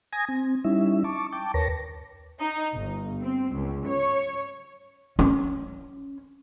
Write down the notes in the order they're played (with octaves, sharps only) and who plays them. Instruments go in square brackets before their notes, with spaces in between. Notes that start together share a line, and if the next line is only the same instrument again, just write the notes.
[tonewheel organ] G#5 D#6 G#6 A#6
C4
G3 C#4 D#4 E4 E5
A5 C#6 D6
G5 A5 D6
D#2 A#4 B4 C#5 A5 A#6
[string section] D#4
G1
C4
C#2
C#5
[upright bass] C#4